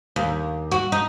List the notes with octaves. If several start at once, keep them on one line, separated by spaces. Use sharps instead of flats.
D#2
F#4
D#4